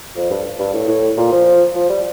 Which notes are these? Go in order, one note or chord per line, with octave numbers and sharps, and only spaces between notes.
F2
G2
G2
A2
A2
A#2
F3
F3
G3